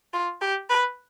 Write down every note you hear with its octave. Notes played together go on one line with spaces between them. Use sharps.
F4
G4
B4